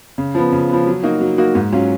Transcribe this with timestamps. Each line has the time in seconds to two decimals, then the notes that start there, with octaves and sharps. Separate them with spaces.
0.18 C#3
0.35 F3 B3
0.52 C#3
0.69 F3 B3
0.87 F#3
1.03 A#3 D#4 F#4
1.21 F#3
1.38 A#3 D#4 F#4
1.55 G#2
1.72 F#3 C#4 F4